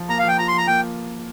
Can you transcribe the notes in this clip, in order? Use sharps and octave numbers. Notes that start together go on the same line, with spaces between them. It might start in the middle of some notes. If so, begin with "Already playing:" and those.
Already playing: F3
A#3 A#5
F5
F3 G5
F4 A#5
C6
F3 A#5
A#3 G5